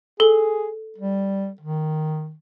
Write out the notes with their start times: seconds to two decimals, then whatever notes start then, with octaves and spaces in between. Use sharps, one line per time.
0.20 G#4 A4 G7
0.98 G3
1.61 D#3